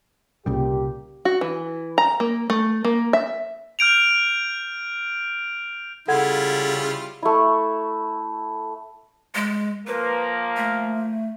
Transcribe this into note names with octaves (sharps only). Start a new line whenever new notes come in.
C2 A#2 C#3 G3 G4
F#4
E3
A#5
A#3
A3
A#3
E5
F6 G6 D7 F7
C#3 G3 E4 F4 A4 F#5 G#6
A3 E4
G#3
F3 A#3 B4
A3